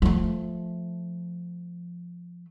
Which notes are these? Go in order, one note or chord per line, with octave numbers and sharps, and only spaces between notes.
F3 A3